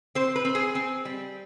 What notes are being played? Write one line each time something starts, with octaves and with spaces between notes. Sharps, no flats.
C4 C5
B4
C4
G#4
C4
G3